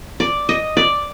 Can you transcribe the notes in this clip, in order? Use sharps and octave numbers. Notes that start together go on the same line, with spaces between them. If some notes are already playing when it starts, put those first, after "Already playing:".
D5
D#5
D5